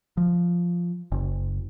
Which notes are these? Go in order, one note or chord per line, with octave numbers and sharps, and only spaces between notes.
F3
F#1